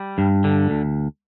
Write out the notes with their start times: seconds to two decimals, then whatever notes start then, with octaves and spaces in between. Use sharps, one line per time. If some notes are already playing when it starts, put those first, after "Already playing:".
Already playing: G3
0.18 G2
0.44 D3
0.70 D2